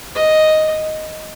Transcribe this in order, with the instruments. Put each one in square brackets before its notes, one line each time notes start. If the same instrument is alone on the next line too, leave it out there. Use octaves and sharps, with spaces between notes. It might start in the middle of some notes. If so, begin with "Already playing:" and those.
[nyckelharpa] D#5